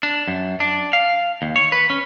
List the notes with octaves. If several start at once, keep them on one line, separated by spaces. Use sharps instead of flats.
D4
F#2
D4
F5
D#2
C#5
B4
C#4